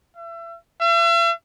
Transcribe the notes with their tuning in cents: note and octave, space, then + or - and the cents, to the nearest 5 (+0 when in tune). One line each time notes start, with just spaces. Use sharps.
E5 +35
E5 +40